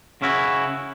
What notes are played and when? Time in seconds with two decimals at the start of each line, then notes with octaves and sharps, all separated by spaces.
0.22 C#3 C#4 E4 F#4